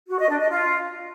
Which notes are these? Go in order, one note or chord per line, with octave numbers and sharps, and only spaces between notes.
F#4
D#5
D4
D#5
F4